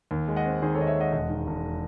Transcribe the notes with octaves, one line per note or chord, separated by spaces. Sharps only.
D#2
G#3
D#5 F#5
C4
D#3 G#4 C5
D#2 A4 C#5 D#5
C#5 E5
G#3 D#5 F#5
E1 D#5 F#5
D#3
E1